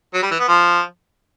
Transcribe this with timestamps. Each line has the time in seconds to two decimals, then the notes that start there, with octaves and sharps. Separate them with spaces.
0.14 F#3
0.22 G3
0.31 E3
0.40 B3
0.48 F3